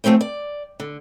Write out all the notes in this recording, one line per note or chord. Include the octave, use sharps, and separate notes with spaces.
F3 A3 C4 C#4 G5
D5
D3